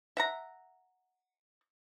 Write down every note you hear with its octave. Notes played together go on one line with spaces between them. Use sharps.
E5 F#5 A#5